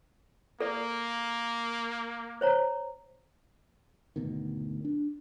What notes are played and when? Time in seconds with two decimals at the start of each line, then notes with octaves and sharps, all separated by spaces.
0.60 A#3 A4 D5
2.41 C5 C#5 A#5
4.16 G#1 D2 B2 D#3
4.85 D4